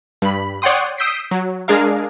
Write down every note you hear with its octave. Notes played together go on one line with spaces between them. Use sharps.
G2 B5
C#5 D5 F#5 G5 C6 D#6
D#6 E6 G6 B6 C7 D7
F#3
G#3 D4 G#4 A#4 F5